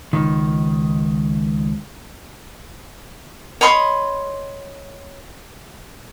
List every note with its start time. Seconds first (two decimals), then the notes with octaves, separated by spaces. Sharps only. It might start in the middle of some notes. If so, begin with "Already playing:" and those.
0.13 C#2 D#3
3.61 C#5 D#5 B5 C6